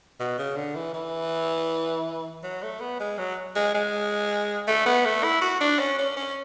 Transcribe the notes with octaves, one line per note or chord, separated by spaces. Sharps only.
B2
C#3
D3
E3
E3
F#3
A3
B3
G#3
F#3
G#3
G#3
A3
B3
A3
E4
F#4
D4
C#4
C#4
C#4